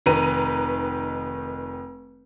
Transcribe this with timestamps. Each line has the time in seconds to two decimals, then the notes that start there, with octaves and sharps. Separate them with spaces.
0.06 F1 D#3 B4 A#5 D#7